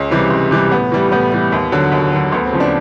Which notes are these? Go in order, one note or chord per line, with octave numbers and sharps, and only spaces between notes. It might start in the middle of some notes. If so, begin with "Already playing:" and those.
Already playing: C#2 C#4
C3 E3 G3
C#2
C3 E3 G3
A2 B3
E3 G3
A2 B3
E3 G3
D#2
D3 F#3
D#2
D3 F#3
D2 B3
C4
C#3 F3
D4